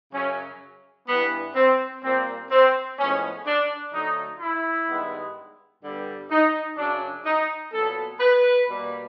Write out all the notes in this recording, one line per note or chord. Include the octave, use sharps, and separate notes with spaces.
F#2 C#3 F#3 C#4
G2 E3 G3 B3
C4
A#2 G3 A#3 C4
C4
A2 F3 G#3 B3 C#4
D4
D3 F#3 A3 D#4
E4
G2 D#3 G#3 B3
G2 D3 G3 B3
D#4
F#2 C#3 F#3 D4
D#4
A#2 F#3 B3 A4
B4
B2 G3 A#3